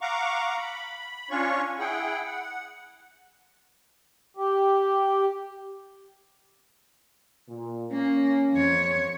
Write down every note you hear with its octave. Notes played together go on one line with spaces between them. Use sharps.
F5 F#5 A#5 C#6 D6
B5
C#4 D4 F4 C#5 C#6
E4 G#4 F#5 G5
F#5
G4
A#2
A#3 C#4
F2 C#5